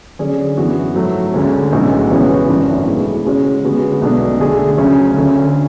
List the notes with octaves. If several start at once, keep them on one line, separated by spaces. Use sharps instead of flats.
D3 F#3 C#4 G#4 D5
F#2 E3 B3 F#4
G#2 F#3 A3
D2 D3 G#3 C#4
B1 A2 G#3 C#4 F#4
C#3 E3 B3 F#4 C#5
G#1 F#2 E3 A3 D4
B2 A3 E4 G#4
C#3 G#3 C#4 F#4 C#5
D3 G#3 B3 F#4
B1 B2 A3 D4
D3 A3 D4 G#4
D2 C#3 F#3 C#4
D2 D3 A3 C#4